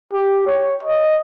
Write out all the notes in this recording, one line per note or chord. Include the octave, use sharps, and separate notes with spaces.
G4
C#5
D#5